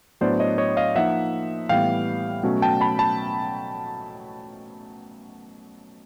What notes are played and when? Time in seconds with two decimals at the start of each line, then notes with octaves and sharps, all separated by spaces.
0.21 A2 F#3 B3 D4 C5 D5
0.40 C#5 D#5
0.58 C#5 D#5
0.77 D#5 F5
0.96 F3 A#3 D#4 E5 F#5
1.69 A2 E3 G3 B3 F5 G5
2.43 B2 F#3 A3 C#4
2.62 G5 A5
2.81 A5 B5
2.99 A5 B5